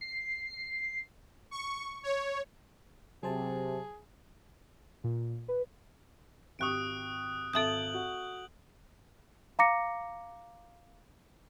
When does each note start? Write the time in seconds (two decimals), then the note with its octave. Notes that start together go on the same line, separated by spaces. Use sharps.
0.01 C7
1.51 C#6
2.03 C#5
3.23 C3 F#3 G#4 C5 A5
5.04 A#2
5.48 B4
6.59 G#1 G4 C#6 D#6 F#6 D7
7.53 G#1 A4 E5 A5 D#6 G6 D7 F#7
7.94 F#4
9.59 F5 A#5 D6 A#6 C#7